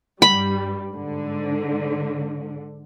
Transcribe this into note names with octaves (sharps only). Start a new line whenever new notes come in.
G2 G3 B5
G#2 D3